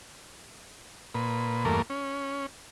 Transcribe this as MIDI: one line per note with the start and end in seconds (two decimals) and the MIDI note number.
1.15 1.65 46
1.15 1.65 71
1.65 1.82 40
1.65 1.82 43
1.65 1.82 57
1.65 1.82 58
1.65 1.82 70
1.90 2.46 61